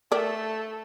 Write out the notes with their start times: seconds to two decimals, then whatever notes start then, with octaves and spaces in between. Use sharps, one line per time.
0.12 A3 A4 A#4 D5